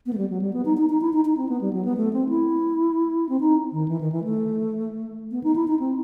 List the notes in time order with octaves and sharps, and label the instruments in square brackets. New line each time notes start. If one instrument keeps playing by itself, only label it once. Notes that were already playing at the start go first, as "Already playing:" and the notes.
[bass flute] B3
A3
G3
F#3
G3
B3
D#4
D#4
D#4
E4
D#4
D#4
C4
B3
G3
F#3
B3
A3
C4
E4
C4
D#4
D#3
E3
D#3
E3
A3
B3
D#4
E4
D#4
C4